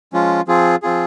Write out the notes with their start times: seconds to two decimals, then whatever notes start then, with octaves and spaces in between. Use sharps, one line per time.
0.13 F3 G#3 C#4 F4
0.48 F3 C4 F4 G#4
0.83 F3 C4 F4 G#4